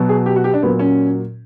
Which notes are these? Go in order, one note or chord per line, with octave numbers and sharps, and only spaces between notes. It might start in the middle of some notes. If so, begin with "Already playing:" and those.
Already playing: B2 F#3
G#4
G4
F#4
G4
D4
A#2 F#3 B3
C#4